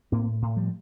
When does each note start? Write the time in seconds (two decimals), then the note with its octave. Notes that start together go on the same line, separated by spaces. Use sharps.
0.12 A2 A#3 C4
0.42 A2
0.56 F3 G3